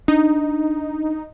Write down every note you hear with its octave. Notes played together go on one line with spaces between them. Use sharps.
D4 D#4